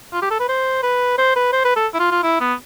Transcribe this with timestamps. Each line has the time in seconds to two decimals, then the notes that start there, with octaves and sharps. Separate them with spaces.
0.13 F4
0.22 G4
0.31 A4
0.39 B4
0.48 C5
0.83 B4
1.18 C5
1.36 B4
1.53 C5
1.65 B4
1.76 A4
1.94 E4
1.99 F4
2.11 F4
2.23 E4
2.40 B3